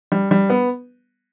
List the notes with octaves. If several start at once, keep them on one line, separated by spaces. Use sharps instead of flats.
G3
G3
B3